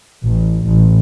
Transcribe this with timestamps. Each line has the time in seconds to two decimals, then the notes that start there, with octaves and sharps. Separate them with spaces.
0.25 A1
0.67 A1